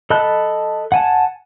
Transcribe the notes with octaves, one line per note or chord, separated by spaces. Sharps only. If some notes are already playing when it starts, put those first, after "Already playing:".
A4 D#5 A5 B5 F#6
F#5 G#5 A5